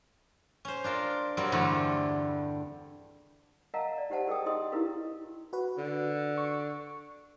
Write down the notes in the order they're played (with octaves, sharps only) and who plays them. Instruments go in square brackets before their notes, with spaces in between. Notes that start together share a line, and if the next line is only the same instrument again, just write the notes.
[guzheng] C#4 C5
D4 F4 A#4
F#3 G3 C4 G4 A#4
E2 G2 D3 G3 A3 D4
[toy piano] A#4 D#5 F5 F#5 A5 A#5
D5
D#4 G4 C5 F#5 A5
G#4 A#4 D#5 G5 D#6
D#4 G#4 D#5 E5 C6 D#6
D#4 E4 G4 A#4 B4 F5
[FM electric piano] F#4 B4
[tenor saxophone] D3
[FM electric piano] C#6